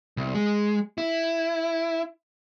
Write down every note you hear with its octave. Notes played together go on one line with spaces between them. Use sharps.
C2
G#3
E4